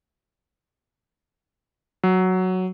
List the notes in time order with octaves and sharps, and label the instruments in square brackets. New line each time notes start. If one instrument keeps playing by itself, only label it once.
[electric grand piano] F#3